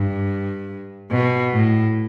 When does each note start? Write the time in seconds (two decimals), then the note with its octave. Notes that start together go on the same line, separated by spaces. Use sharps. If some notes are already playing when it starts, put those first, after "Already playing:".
Already playing: G2
1.11 B2
1.53 A2